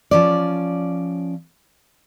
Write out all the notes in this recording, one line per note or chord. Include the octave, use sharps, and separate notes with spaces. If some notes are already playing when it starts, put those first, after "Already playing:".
F3 C#4 D5